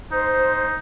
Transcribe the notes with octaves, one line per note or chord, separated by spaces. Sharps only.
D#4 C5